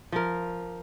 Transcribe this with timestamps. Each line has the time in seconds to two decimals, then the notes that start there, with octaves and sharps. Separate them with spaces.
0.12 F3 A#4